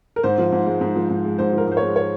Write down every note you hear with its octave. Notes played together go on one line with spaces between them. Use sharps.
A#4
G#2 C5
F3
G#2
G#3
G#2
F3
G#2
G#3
G#2 C5
F3 A#4
G#2 C5
C#5
G#3
C#5